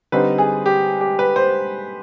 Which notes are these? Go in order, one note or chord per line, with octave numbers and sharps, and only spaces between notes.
D3 G3 C4 D#4 B4
G#4
G4
G4
B4
C5